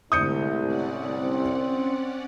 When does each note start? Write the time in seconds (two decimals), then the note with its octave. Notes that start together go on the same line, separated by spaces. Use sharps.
0.12 C2 G#2 D3 A3 D#6 G6 C#7
0.65 C#4 D5 F#5
1.21 C4